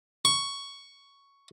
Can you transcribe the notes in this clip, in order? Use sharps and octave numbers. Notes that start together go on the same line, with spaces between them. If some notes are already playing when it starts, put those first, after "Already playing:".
C#6